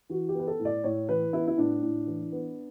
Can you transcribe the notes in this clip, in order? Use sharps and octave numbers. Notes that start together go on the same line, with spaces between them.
E3 F#4
G4
B3 B4
A4
A2
D5
A2 C#5
E3 B4
B3 E4
E4
A2 D4
A2
E3
B3